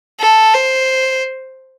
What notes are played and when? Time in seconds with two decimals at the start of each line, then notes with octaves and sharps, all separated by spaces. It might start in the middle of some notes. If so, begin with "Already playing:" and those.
0.20 A4
0.54 C5